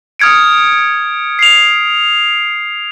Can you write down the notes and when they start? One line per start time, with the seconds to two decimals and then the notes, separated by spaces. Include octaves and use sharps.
0.19 D#6 F6 G#6 C#7 D7
1.39 C7 F7